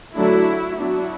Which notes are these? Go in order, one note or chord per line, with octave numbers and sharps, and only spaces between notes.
D3 F#3 A3 D4 E4 F#4
F#3 B3 D4 E4 F#4